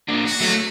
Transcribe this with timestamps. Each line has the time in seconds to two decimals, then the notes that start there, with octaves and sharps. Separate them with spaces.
0.08 A#3 D4
0.25 F#4
0.40 F#3 A3